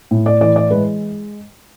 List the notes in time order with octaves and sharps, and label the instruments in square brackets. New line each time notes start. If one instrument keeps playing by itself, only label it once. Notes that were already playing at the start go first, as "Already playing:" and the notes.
[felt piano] A2
D5
E3 D5
D5
G#3 B4